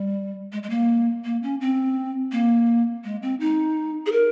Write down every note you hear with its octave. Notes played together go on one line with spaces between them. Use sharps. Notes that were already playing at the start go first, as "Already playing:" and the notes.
Already playing: G3
G#3
G#3
A#3
A#3
C#4
C4
A#3
G#3
C4
D#4
G#4
A#4